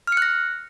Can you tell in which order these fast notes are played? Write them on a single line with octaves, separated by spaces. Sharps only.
F6 C#7 F#6 A#6